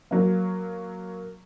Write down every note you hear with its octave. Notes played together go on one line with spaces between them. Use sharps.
F#3 A#3